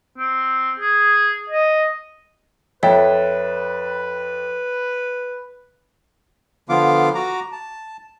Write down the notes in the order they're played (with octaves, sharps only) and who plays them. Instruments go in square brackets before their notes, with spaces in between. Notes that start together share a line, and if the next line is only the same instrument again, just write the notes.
[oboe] C4
G#4
D#5
[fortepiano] F2 A4 G5 [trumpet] B4 [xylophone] C#5 E5
[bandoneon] D3 F3 B3 F4 F5 D6
F#4 A#5 D6
A5